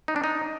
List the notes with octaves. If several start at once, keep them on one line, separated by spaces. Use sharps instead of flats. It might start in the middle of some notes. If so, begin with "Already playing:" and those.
D#4
D4
D#4